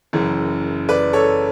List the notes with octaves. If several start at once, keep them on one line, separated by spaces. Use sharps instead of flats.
F#1 F#2 E3
B4 D5
A4 C#5